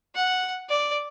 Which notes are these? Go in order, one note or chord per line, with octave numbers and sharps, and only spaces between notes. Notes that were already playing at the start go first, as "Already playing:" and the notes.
F#5
D5